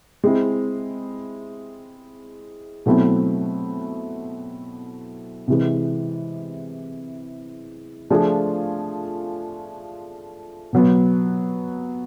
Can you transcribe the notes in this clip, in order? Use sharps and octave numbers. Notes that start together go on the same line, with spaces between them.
G#3 C4 E4
B2 F#3 A3 C4 E4
C3 E3 G#3
F3 A3 D4 F4 G#4
B2 F#3 B3